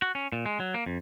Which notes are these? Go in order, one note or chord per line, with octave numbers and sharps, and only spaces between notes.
F#4
C#4
A#2
G#3
F#3
A#3
F2